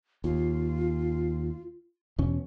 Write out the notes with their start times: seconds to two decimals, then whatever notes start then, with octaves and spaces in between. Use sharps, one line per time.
0.24 D#2 F4
2.19 E2 B2 C#4